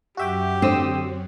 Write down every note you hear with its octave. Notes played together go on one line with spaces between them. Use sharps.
F#2 F#3 F#4 G4 E5 G5
D3 C4 D#6 E6